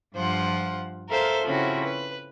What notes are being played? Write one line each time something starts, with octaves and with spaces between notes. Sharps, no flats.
G2 F3 F4 C5 F#5
A4 A#4 C5 E5 F5
C#3 F3 C4 C#4 E4 F#4
B4